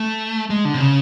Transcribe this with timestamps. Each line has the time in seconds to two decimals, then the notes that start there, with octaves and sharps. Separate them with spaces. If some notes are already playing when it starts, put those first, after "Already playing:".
Already playing: A3
0.50 G#3
0.65 D3
0.74 C3
0.80 C#3